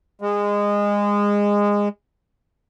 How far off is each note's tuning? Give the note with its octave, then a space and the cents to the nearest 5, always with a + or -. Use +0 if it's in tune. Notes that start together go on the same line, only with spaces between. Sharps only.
G#3 -20